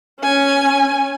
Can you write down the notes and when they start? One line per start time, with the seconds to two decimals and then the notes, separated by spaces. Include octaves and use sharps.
0.21 C#4 G#5